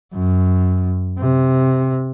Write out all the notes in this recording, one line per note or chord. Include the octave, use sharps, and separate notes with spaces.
F#2
C3